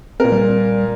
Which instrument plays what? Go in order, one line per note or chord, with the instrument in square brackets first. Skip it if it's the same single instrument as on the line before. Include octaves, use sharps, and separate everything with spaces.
[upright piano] A#2 A#4 [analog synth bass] C4
[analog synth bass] G3